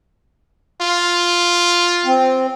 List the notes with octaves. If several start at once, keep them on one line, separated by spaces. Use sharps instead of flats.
F4
C4